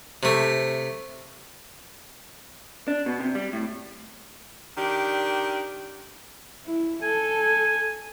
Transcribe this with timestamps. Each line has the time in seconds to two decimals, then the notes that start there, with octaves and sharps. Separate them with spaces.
0.23 C3 A3
2.88 D4
3.06 B2
3.20 C3
3.35 G3
3.53 A2
4.77 D#3 D4 G4
6.66 E4
7.03 A4 G#5